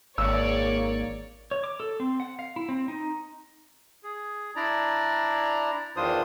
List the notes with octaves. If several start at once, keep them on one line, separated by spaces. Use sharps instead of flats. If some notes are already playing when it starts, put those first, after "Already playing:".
G#1 A#3 C#5 D5 E6
C#5
D6
A4
C4
F#5
F5
E4
C4
D#4
G#4
D4 E4 D5 A#5
E2 D#3 D4 F4 C5 D#6